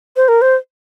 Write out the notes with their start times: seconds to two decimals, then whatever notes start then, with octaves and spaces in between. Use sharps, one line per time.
0.16 C5
0.28 A#4
0.42 C5